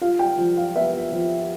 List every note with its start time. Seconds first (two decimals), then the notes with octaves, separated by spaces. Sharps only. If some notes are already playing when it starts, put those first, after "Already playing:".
0.01 F4 F5
0.19 G5
0.38 F3
0.57 F5
0.76 B3 E5
1.12 F3